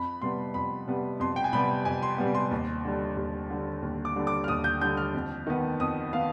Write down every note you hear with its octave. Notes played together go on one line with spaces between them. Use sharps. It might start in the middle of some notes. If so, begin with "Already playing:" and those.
Already playing: F2 B5
C3 G3 B3 C6
F2 B5
C3 G3 B3
F2 C6
G5
G#5
C3 G3 B3 B5
F2 G#5
C6
C3 G3 B3
C6
D#2
D3 G3
D#2
D3 G3
D#2
D6
D3 G3
D6
F6
D#2 D#6
G6
D3 G3 G6
F6
F2
D#3 B3
F2 D#6
D#3 B3 F5